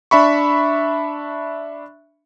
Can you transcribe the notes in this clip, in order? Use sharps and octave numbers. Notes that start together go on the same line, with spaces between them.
D4 E5 B5 C#6